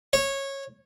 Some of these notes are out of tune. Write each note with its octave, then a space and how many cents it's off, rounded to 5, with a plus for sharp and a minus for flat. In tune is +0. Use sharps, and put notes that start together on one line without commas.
C#5 -15